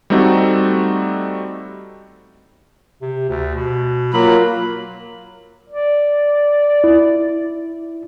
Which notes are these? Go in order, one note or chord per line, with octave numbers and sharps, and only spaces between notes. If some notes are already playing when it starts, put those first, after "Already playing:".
G3 A3 C4 D#4 F#4 A4
C3
D2
B2
F#3 A#3 F4 B5
D5
E4